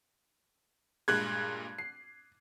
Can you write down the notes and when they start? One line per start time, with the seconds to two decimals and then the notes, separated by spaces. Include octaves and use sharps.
1.08 G2 A#2 G#3 F#6 G#6
1.78 C7